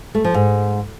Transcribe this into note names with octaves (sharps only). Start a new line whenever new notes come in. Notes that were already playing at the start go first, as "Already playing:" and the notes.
A3
F3
G#2